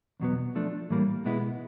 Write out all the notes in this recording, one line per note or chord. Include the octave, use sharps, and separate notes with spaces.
E2 B2 F#3 B3
F3 A3 D4
A2 E3 G3 A#3
B2 G#3 B3 E4